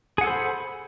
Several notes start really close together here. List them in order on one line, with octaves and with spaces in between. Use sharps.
G#4 F#5 A4 C5 B5